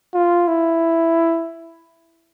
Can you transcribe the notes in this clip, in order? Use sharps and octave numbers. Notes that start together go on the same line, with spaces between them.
F4
E4